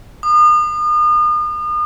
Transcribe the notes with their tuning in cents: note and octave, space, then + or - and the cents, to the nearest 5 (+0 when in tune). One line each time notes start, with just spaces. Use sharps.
D#6 -40